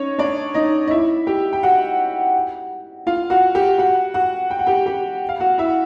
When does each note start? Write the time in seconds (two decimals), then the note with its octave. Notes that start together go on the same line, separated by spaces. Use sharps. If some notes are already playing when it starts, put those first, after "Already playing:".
Already playing: C#4 D#4 C#5
0.18 D4 D5
0.54 D#4 D#5
0.87 D#5
0.90 E4 E5
1.27 G4 G5
1.53 G5
1.63 F#4 F#5
3.07 F4 F5
3.30 F#4 F#5
3.55 G4 G5
3.78 F#4 F#5
4.14 F#4 F#5
4.50 G5
4.59 F#5
4.66 G4 G5
4.86 G4 G5
5.29 F5
5.40 F#4 F#5
5.58 E4 E5